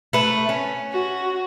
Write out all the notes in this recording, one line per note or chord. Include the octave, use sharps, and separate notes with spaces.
A3 B4
C#4
F#4